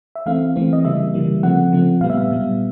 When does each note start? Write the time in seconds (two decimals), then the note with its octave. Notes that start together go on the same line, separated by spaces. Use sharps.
0.16 E5
0.26 E3 A3 C4 F5
0.56 E3 A3 C4
0.73 D#5
0.84 C#3 E3 G3 A#3 E5
1.14 C#3 E3 G3 A#3
1.43 C#3 F3 A3 C4 F#5
1.73 C#3 F3 A3 C4
2.01 A#2 G3 B3 F5
2.10 E5
2.17 F5
2.31 A#2 G3 B3